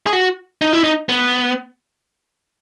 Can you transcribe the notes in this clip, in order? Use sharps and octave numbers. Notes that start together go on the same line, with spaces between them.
G#4
F#4
D#4
E4
D#4
B3